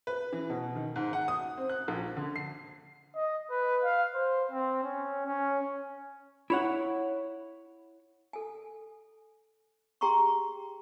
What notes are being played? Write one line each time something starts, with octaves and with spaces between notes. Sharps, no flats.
B4
E3
B2
D#3
G#2
F#5
D#6
C4
F#6
A#1
D3
C7
D#5
B4
F5
C5
C4
C#4
C#4
E4 C#5 F#5
A4 G#5
G4 G#4 G5 A#5 C6 C#6